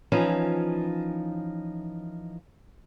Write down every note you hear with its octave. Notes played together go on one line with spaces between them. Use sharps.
E3 F3 C#4 D#4 F4